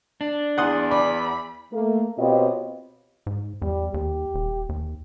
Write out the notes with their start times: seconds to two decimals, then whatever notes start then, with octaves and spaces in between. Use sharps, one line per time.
0.21 D4
0.58 E2 F#5 C6 D#6
0.91 D5 B5
1.73 A3 A#3
2.18 B2 C4 F4 G4 C#5 D#5
3.27 G#2
3.62 E2 G3
3.94 D#2 G4
4.34 D#1
4.69 D#2